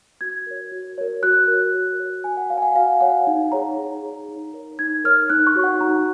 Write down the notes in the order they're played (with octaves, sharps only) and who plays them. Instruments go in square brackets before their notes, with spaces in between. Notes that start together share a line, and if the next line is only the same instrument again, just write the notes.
[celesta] F#4 G#6
A#4 C#5
F#4
A#4 C#5
F#4 F#6
A#4
C#5
F#4
A#4 C#5
F#4 G#5
F#5
C#5 F5
G#5
F#5
F#4 F5
C#5 F#5
D#4
G#4 C#5 A#5
D#4
G#4 C#5
D#4
A#4 C#5
D#4 G#6
A#4 C#5 F6
D#4 F#6
C#6
F#4 C#5
F#5
D#4 A#5